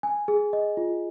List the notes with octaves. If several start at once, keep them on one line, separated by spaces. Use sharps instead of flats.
G#5
G#4
D#5
F4